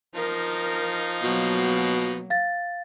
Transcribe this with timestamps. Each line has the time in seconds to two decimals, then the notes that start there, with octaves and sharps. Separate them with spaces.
0.15 F3 D#4 A#4 F5
1.23 B2 F#3 A#3
2.30 F5 A6